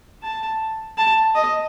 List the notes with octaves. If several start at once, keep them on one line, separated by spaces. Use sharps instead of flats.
A5
A5
D#5